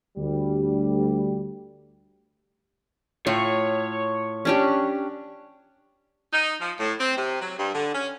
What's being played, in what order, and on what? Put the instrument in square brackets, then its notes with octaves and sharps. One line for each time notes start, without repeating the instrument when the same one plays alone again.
[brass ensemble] D2 G3
[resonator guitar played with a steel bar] A2 F4 [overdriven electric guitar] C#5
[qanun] C#4 D4 G4
[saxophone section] D#4
F3
A2
C4
C3
F#3
G2
D3
C#4